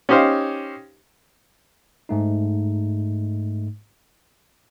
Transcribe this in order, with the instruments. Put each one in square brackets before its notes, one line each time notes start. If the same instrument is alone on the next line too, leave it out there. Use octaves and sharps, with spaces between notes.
[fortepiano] C#4 D#4 G4 C5 F5
[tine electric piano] G#2 A3 D#4